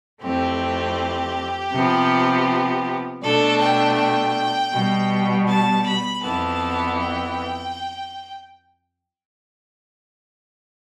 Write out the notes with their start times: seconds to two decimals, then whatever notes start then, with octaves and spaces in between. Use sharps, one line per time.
0.22 F2 E3 A3 C4 G4
1.72 C3 F3 B3
3.23 B2 A3 D4 A4
3.60 G5
3.98 G5
4.73 B2 G3 B3
5.48 A5
5.86 B5
6.23 F2 E3 B3 A5
6.98 G5